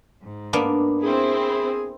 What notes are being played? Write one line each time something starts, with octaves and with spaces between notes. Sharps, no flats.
G#2
A#3 B3 D4
C4 E4 G#4